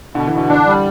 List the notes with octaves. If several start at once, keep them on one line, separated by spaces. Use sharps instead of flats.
B2 D3
E3
B2 D3
D3 D4
G3